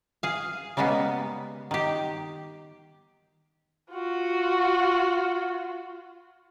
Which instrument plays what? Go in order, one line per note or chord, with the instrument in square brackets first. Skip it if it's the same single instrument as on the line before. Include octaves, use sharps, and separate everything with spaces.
[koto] G#4 F5
C#3 G3 G#3 A#3 B3
D#3 G4
[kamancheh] F4 F#4